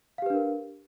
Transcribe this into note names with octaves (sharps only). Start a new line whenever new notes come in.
D4 G4 A#4 B4 F5